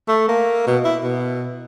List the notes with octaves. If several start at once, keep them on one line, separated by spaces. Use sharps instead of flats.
A3
A#3
B2
E4
B2